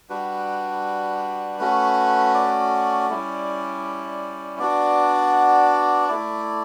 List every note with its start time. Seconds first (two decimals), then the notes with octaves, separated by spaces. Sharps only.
0.09 G3 D4 F#4 B4
1.60 A3 C#4 F#4
2.34 D5
3.10 G3 C#4 E4
4.59 B3 D4 F#4 D5
6.09 A3 E4 D5